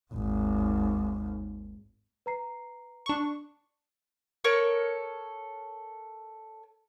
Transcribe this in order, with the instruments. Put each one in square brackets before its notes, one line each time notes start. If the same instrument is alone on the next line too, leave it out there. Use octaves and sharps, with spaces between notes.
[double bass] G#1 D#2
[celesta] B4 A#5 C7
[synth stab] D4 C#6
[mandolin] A4 A#4 C#5